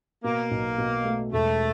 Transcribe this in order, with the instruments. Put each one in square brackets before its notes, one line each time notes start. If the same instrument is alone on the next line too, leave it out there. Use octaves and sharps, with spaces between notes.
[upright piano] B2 [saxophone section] A#3
[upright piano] B1
B2
A3
[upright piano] E1 [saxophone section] A3